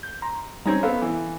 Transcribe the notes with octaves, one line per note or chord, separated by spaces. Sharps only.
G6
A#5 C6
G3 C4 C#4 D#4 A#5 G#6
B3 A4 C5 F5
E3